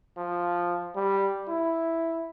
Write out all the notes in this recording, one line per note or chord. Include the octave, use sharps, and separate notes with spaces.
F3
G3
E4